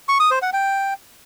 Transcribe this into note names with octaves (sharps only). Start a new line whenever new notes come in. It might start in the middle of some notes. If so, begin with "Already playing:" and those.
C#6
D#6
C5
F#5
G5